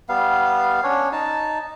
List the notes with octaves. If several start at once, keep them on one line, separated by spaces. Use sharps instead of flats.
G3 B3 F5
C#4 D4 C#5
D#4 A5